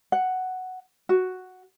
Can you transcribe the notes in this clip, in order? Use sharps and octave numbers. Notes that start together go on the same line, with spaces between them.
F#5
F#4